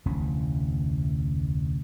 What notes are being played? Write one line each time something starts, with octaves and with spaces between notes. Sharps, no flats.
F1 D2 E3 C#4